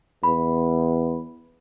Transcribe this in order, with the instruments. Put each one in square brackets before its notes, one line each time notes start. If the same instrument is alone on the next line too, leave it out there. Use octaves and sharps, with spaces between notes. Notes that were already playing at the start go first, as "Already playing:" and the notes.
[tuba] E2 [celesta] B5